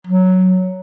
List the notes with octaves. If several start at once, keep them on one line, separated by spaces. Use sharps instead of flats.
F#3